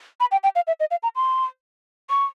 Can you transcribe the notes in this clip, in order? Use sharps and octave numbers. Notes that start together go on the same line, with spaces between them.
B5
G5
G5
F5
E5
D#5
F5
A#5
C6
C#6